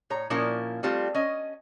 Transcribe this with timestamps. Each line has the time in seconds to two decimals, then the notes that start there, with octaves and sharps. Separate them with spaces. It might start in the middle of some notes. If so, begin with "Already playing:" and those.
0.10 A2 C#5 A#5
0.30 A#2 F3 C#4 E4 A#4
0.83 G3 A3 C4 F4 G4
1.15 C#4 D#5